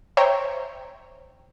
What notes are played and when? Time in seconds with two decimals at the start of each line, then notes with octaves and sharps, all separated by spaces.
0.17 C5 C#5 E5 G5 A#5